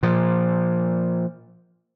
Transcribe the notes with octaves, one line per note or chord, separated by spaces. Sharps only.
A#2 F3